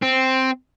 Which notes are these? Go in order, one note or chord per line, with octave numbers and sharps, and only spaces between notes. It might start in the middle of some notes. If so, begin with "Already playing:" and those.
C4